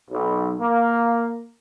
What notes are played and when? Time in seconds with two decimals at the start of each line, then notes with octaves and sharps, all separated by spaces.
0.11 B1
0.60 A#3